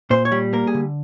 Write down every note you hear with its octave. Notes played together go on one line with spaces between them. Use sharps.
A#2 C5
C#5
G3
A#3 A#4
G#4
D3